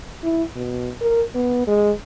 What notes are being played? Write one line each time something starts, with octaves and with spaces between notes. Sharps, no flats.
E4
B2
A#4
B3
G#3